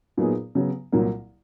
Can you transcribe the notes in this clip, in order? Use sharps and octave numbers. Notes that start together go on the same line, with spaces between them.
A#2 F#3 B3 D#4 G#4
C#3 F#3 B3
C2 A#2 F#3 A#3